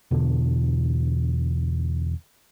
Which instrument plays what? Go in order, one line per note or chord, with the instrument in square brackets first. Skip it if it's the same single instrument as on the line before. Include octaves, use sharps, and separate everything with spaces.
[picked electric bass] E2 B2 D3